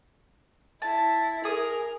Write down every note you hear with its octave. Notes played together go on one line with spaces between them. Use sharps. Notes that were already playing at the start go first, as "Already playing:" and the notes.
E4 A5
G#4 A#4 D#6